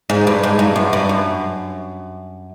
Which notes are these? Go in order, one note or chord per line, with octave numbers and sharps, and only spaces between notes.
G#2
G2
G#2
G2
F#2
G2
F#2